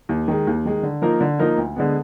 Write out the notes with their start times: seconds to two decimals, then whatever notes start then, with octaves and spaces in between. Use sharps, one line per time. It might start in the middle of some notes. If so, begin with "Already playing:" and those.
0.09 D#2
0.28 D#3 G#3
0.47 D#2
0.65 D#3 G#3
0.83 D3
1.02 F3 A#3 D#4 A#4
1.21 D3
1.39 F3 A#3 D#4 A#4
1.58 D2
1.76 D3 G#3 B3